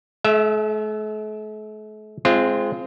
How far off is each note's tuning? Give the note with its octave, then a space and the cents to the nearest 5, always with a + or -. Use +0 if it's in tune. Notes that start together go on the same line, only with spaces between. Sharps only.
A3 -45 E5 +0
G#3 +15 C4 +0 F4 -25